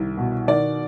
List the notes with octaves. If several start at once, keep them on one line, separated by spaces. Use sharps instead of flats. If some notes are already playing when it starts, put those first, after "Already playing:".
Already playing: C2 D#3
B2
D#3 D5